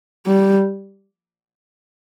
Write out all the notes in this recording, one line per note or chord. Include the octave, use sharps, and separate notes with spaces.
G3